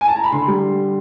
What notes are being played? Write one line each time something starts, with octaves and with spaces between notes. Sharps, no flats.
G#5
A5
A#5
B5
D3 C6
G3